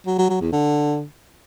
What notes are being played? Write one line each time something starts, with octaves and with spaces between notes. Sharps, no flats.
F#3
F#3
F#3
E2
D3